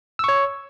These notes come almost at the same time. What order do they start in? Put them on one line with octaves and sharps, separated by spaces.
E6 C#6 C#5